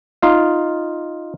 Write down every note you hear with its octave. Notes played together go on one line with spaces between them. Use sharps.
D#4 F4 F5